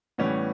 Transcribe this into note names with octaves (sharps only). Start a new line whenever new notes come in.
A2 E3 G3 B3 C#4